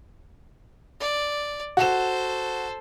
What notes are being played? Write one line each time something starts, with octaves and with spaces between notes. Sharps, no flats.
D5
F#4 A4 C5 E7